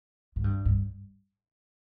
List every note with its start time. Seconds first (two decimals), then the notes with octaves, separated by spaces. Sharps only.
0.36 G#2
0.44 G2
0.65 G2